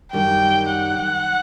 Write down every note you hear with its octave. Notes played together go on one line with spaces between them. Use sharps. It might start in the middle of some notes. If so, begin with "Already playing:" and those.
F#2 D#3 G3 G5
F#5